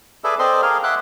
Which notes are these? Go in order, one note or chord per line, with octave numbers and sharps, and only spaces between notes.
G#4 A4 B4 D5 E5
C4 A4 C5 D5 D#5 C6
G#4 A#4 F5
E5 F#5 C6 D6 F#6